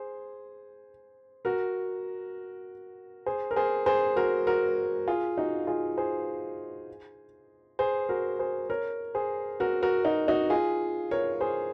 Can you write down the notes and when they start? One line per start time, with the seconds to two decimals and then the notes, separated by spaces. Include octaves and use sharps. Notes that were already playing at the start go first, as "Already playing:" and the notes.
Already playing: G#4 C5
1.45 F#4 A#4
3.26 G#4 C5
3.51 A#4
3.56 G#4 C5
3.86 G#4 C5
4.16 F#4 A#4
4.47 F#4 A#4
5.07 F4 G#4
5.37 D#4 F#4
5.67 F4 G#4
5.97 G#4 C5
7.79 G#4 C5
8.09 F#4 A#4
8.39 G#4 C5
8.70 A#4 C#5
9.15 G#4 C5
9.60 F#4 A#4
9.83 F#4 A#4
10.05 D#4 F#4
10.28 D#4 F#4
10.50 F4 G#4
11.11 A#4 C#5
11.41 G#4 C5